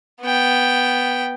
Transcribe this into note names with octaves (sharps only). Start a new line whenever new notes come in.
B3 G5